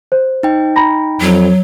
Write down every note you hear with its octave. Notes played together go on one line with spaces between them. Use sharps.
C5
D#4 G5
A#5 B5 A#6
F2 F#3